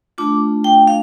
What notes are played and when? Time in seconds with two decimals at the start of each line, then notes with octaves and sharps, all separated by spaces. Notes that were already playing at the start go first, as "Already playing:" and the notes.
0.18 A3 D4 F4 D6
0.64 G5
0.87 F5